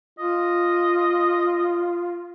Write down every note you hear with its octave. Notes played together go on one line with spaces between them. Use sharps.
F4 D#5